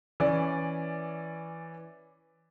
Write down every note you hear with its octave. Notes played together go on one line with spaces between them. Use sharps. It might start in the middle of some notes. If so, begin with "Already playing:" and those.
E3 C#4 D5